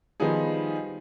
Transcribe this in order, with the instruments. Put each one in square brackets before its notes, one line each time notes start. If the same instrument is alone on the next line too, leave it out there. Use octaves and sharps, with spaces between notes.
[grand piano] D#3 F3 G3 B3 D#4 G#4